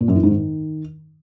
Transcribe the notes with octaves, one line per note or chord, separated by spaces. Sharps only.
A#2
F#2
E3
G#2
D#3